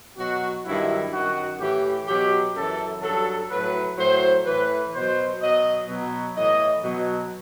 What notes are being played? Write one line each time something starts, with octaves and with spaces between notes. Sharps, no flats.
B2 F#3 F#4
G2 D#3 F#3 E4
F#2 D#3 F#3 F#4
A2 E3 G4
B2 F#3 G4
F#2 E3 A4
G2 F#3 A4
A2 F#3 B4
A2 F#3 C5
A2 E3 B4
B2 F#3 C5
B2 F#3 D#5
B2 F#3
A2 E3 D#5
B2 F#3